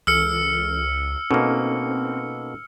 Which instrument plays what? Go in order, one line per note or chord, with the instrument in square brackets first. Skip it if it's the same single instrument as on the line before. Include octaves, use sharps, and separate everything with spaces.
[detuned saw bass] C#2 [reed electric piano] E3 A4 [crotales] E6 F6 C#7
[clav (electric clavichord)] B2 A#3 [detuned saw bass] C4 [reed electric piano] C#4 D#4 A4